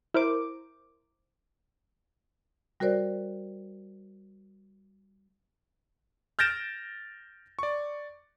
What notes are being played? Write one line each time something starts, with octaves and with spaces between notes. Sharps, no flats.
E4 A#4 C5 D6
G3 F#4 A#4 C5 D5
F6 G6 A6 A#6 D7 E7
D5 C#6